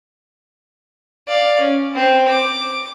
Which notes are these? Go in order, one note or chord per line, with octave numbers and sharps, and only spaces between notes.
D5 F5
C#4
C4
D6